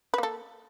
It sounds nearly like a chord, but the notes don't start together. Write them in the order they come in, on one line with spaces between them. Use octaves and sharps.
B4 A#3 A4